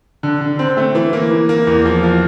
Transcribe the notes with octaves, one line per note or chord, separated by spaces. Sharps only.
D3
D3
C4
A3
E3
A#3
E3
A#3
E2
F3
F3